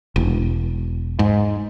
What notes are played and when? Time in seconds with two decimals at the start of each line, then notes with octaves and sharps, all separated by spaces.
0.16 E1
1.19 G#2